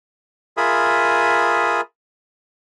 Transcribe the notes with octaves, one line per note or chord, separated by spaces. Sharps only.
F4 G#4 A#4 E5 B5 D#6